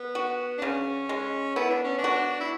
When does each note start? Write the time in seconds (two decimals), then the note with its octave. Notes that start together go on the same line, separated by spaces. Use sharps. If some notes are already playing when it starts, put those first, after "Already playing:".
Already playing: B3
0.15 F#4
0.58 D4
0.62 C#3 C#4
1.09 G#3
1.56 B3 E4
1.70 D4
1.84 C#4
1.98 D4
2.04 F#4
2.40 E4